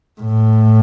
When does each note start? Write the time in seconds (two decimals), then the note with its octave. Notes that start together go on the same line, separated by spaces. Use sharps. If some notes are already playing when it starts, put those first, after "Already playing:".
0.21 A2